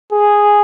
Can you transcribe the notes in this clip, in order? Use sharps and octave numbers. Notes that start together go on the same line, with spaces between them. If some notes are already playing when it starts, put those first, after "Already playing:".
G#4